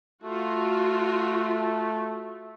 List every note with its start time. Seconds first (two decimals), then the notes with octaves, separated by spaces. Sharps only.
0.24 A3 F4 F#4